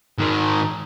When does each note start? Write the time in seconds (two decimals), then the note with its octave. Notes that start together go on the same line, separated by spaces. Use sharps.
0.18 G#2 D#3